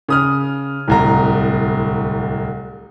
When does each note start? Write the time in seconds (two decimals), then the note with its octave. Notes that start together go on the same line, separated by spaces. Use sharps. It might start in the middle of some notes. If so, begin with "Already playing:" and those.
0.08 C#3 D#6 F6
0.88 D1 C2 A#5